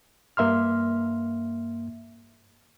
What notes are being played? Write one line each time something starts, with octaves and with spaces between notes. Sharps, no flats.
G2 A#3 E5 C6 F6